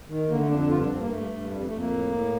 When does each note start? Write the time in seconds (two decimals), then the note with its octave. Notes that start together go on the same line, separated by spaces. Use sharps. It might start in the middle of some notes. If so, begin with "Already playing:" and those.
0.08 D#3
0.29 D3 A#3
0.39 A3
0.48 F2 D4
0.59 D4
0.69 G2 F4
0.80 D4
0.89 G2 C4
1.00 A#3
1.09 G2 A3
1.31 G2
1.51 F2 G3
1.65 A3
1.71 F2
1.78 A#3
1.92 A2
2.12 A2